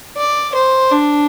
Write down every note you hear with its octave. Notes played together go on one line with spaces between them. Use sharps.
D5
C5
D4